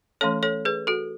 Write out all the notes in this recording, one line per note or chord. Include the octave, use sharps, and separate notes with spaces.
E3 A3 C#4 A4 C#5
A4 C#5
G#4 B4
F#4 A4